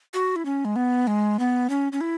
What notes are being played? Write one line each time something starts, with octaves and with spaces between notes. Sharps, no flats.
F#4
E4
C#4
G#3
B3
G#3
B3
C#4
C#4
E4